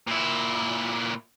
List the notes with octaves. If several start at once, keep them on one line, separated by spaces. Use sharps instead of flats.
A#2 E4